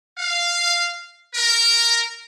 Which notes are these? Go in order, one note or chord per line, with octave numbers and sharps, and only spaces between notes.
F5
A#4